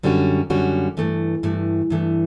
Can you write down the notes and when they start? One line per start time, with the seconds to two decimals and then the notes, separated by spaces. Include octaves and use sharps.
0.03 F#2 D3 G3 C#4 F#4
0.50 F#2 D3 G3 C#4 F#4
0.97 G2 E3 A3
1.43 G2 E3 A3
1.90 G2 E3 A3